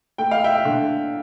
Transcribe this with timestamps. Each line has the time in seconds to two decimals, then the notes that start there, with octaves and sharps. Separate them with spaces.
0.18 A3 G5
0.31 F5
0.44 E5 G5
0.65 D3